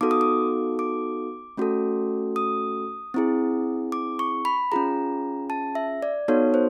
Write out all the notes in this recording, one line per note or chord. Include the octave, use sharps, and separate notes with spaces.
B3 D#4 F#4 A4 D6
D#6
D6
D6
A3 C#4 F#4 A4
D#6
C4 E4 G#4
D6
C#6
B5
C#4 F4 G#4 A#5
A5
E5
D5
B3 D#4 F#4 A4 C#5
C5